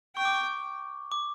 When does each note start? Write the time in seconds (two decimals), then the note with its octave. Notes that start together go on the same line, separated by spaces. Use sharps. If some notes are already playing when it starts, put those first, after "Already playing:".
0.16 G5 C#6
0.25 D6
0.34 C#6
1.12 D6